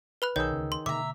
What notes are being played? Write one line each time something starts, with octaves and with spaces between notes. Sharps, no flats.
B4 B5 F#6
B1 D#3 G#4 C#5 E6 G6
D2 C#3
C6
B2 D3 A#3 E5 A#5 D6